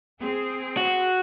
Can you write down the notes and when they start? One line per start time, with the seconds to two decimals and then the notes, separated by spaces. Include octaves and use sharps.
0.20 C4 G#4
0.77 F#4